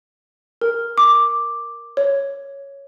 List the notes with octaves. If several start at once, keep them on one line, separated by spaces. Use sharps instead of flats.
A#4
D6
C#5